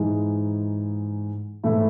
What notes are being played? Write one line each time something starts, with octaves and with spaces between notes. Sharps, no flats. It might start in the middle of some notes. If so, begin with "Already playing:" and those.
Already playing: G#2 E3 G#3 D#4 G#4
G#2 E3 A3 E4